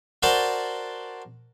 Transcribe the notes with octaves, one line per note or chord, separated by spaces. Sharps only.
F#4 A#4 C5 D5 G5 A5